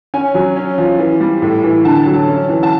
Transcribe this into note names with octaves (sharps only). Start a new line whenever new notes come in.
C#4 G#5
F#3
C#4
F3
E3
G3
A2
E3
D3 A5
F#3
C#4
E3
A5